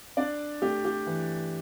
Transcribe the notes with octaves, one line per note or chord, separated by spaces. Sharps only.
D4 D5
A3 G4
G4
E3